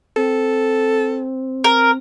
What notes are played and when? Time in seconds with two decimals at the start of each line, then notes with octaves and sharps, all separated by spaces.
0.16 C4 A4
1.64 A#4